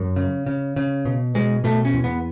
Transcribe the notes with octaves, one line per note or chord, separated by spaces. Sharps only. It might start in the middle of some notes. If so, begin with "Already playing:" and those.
Already playing: F#2
C#3
C#3
C#3
B2
B2 G#3
B2 A3
C#4
E2
B3